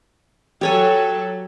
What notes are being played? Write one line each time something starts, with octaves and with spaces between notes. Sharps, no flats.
F#3 G4 A4 C#5 G#5